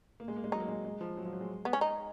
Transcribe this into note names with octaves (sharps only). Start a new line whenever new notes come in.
A#3
G#3
A#3
G#3
F#3 D#4
A#3
G#3
G#3
F3
F#3
F3
F#3
G#3
B3
C#4
D#4